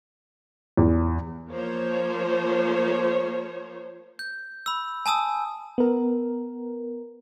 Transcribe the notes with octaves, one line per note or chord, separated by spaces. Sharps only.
E2
F3 A#3 C5 C#5
G6
B5 E6
G#5 A5 D#6 E6
B3 A#4